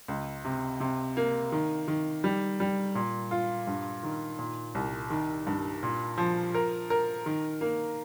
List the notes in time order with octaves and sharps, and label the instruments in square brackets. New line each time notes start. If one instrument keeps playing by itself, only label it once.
[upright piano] C#2
C3
C3
A#3
D#3
D#3
G3
G3
A#2
F4
G2
D#3
A#2
C2
D#3
G2
A#2
F3
A#4
A#4
D#3
A#3